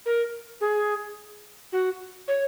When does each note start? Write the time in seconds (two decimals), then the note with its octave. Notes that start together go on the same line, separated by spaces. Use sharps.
0.06 A#4
0.61 G#4
1.72 F#4
2.28 C#5